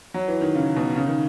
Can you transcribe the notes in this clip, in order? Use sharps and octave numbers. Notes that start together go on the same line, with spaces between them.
F#3
E3
D#3
C#3
B2
C#3
D#3